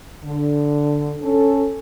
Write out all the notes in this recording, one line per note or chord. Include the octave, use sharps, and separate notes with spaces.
D3
C#4 A4